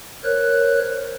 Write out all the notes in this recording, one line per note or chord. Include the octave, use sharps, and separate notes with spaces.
A#4 C5 C#5 F#6